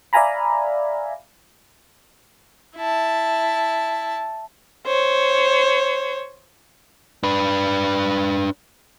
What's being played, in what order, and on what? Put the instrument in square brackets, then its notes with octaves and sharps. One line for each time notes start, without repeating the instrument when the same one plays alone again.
[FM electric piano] D5 E5 F5 G#5 A#5 B5
[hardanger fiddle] E4 A5
[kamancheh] C5 C#5
[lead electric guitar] D4 B4